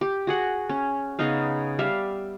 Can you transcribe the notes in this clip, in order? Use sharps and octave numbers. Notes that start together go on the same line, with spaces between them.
G4
F#4 G#4 F#5
C#4
C#3 B3 D#4 F5
G3 E5 F5